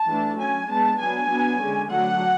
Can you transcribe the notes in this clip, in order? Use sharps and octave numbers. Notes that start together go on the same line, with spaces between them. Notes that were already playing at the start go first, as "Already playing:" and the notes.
Already playing: A5
E3 A3 D4
F#3 C#4 G#5
G#3 B3 D4 A5
F#3 B3 D4 G#5
F#3 B3 D4
D3 G#3 C#4
D3 F#3 A3 D4 F#5